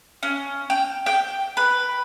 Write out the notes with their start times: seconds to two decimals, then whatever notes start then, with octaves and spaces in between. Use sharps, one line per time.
0.23 C#4
0.70 G5
1.06 G5
1.57 B4